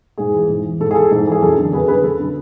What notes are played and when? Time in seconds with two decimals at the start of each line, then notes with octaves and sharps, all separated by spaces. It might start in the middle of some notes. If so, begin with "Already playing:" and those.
0.18 G#2 G#4
0.34 E3
0.49 G#2
0.64 E3
0.80 G#2 A4
0.91 G#4
0.95 E3 A4
1.11 G#2
1.27 E3 G#4
1.42 F#2 A4
1.58 D3
1.73 F#2 G#4 B4
1.88 D3 G#4 B4
2.04 F#2 A4
2.20 D3